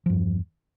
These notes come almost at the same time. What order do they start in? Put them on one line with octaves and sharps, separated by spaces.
F3 G2 E2